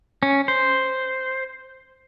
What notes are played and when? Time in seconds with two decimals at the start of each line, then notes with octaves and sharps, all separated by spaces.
0.23 C#4
0.48 C5